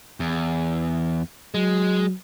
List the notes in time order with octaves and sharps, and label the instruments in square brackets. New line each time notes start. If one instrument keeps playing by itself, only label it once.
[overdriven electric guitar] E2
[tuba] F#3 [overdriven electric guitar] G#3